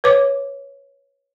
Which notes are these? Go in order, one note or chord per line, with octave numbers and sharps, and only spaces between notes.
B4 C#5 D6